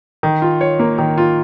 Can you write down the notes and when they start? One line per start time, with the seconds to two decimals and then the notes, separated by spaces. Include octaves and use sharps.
0.23 D#3
0.42 F4
0.61 C#5
0.79 A#3
0.99 D#3
1.18 F4